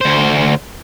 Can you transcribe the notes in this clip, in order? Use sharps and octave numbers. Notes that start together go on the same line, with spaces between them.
D2 C5